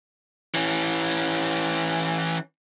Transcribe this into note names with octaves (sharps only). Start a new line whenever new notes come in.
E3 C#4